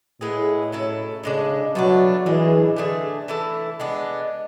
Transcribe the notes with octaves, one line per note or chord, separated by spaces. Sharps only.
A2 G#3 B3 E4 G#4
F#3 C#4 E4 A4
A2 C#3 G#3 D4
B2 F#3 A3 D4
A2 E3 G#3 D4 G#4
D3 A3 D4 G#4
E3 A3 E4 A4
G#3 B3 D4